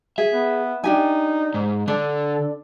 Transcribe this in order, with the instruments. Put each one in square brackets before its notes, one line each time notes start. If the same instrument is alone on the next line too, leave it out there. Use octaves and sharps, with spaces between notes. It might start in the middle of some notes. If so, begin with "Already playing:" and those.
[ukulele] G#4 [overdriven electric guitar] E5
[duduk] B3
[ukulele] D4 G4 G#5 [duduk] D#4
[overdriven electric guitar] G#2
[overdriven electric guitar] D3 [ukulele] D4 [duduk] A4